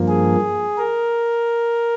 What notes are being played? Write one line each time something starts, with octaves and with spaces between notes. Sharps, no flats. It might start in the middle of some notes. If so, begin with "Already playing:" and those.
Already playing: G2 F3 A#3
G#4
A#4